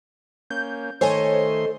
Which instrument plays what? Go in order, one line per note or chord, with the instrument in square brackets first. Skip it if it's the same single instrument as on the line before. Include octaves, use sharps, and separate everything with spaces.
[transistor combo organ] A#3 C#4 [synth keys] G6
[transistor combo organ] D#3 A3 C6 [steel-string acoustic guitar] A4 D#5 [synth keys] C5 C#5 G#5